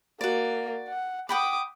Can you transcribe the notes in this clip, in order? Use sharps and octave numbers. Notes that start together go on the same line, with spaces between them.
A#3 F#4 D5
F#5
F#5 G5 B5 D6 D#6